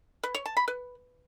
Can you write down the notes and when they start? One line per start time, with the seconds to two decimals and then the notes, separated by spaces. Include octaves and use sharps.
0.23 B4
0.35 C#5
0.46 A5
0.57 B5
0.68 B4